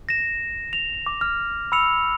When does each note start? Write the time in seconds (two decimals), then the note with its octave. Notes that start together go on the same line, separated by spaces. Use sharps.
0.09 A#6 E7
0.73 F7
1.06 D6
1.21 F6
1.72 B5 E6 C#7 F7